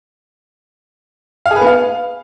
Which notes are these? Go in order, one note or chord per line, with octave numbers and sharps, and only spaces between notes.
F5
G#4
B4
B3
F5